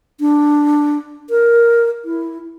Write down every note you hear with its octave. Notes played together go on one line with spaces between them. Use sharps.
D4
A#4
E4